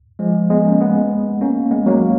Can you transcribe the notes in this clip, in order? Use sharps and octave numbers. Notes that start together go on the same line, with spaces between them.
F3 G#3
G#3 B3
A#3 C#4
G#3 B3
A#3 C#4
G#3 B3
F#3 A#3